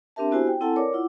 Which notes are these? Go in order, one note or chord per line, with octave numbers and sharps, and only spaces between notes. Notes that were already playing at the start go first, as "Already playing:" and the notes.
C4 D4 G4 A#4 E5 A5
B3 E4 F#4 G4 C5 G#5
G5
C4 E4 A4 F#5 G#5 A5
A#4 C#5 D5 D6
E4 F4 F#5 D6